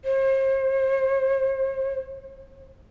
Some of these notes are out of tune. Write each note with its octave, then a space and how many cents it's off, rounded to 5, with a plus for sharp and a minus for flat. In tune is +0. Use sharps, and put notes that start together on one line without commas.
C5 +40